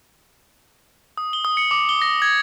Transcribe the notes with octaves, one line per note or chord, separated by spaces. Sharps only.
D#6
G7
D#6
C#7
D6
G7
A#6
G#6